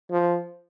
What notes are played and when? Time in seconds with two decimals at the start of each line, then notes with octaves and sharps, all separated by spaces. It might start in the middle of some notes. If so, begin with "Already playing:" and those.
0.11 F3